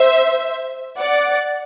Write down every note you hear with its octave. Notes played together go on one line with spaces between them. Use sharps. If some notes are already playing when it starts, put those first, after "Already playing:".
Already playing: C5 E5
D5 F#5